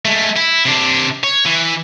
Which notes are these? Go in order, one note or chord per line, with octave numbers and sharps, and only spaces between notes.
G#3 A3
E4
C3 D4
C#5
E3